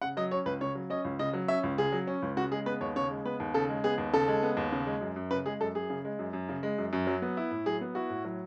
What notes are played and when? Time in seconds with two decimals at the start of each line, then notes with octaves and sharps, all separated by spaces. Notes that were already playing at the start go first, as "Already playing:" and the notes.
0.02 C#3 F#5
0.17 F#3 D#5
0.31 C#4 C#5
0.46 C#2 B4
0.61 C#3 C#5
0.75 F#3
0.90 C#4 D#5
1.05 C#2
1.19 C#3 D#5
1.34 F#3
1.48 C#4 E5
1.63 C#2
1.78 C#3 G#4
1.92 F#3
2.07 C#4
2.22 C#2
2.37 C#3 F#4
2.52 G#3 G#4
2.66 B3 B4
2.81 D#2 C#5
2.96 C#3 C#5
3.10 G#3
3.25 B3 B4
3.40 D#2
3.54 C#3 A4
3.69 G#3
3.84 B3 G#4
3.98 D#2
4.13 C#3 A4
4.28 G#3
4.43 B3
4.57 D#2
4.72 C#3
4.86 G#3
5.01 F#2
5.16 F#2
5.31 C#3 B4
5.46 G#3 G#4
5.60 F#2 A4
5.75 F#2 G#4
5.90 C#3
6.05 G#3
6.19 F#2
6.33 F#2
6.49 C#3
6.63 G#3
6.78 F#2
6.93 F#2
7.07 F#3
7.22 B3
7.37 E4
7.51 A2
7.66 F#3 G#4
7.81 B3
7.95 E4 F#4
8.10 A2
8.25 F#3